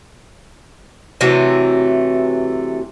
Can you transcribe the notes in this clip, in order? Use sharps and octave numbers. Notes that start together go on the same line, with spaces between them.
C3 E3 F#3 A3